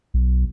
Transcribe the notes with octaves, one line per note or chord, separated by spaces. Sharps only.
B1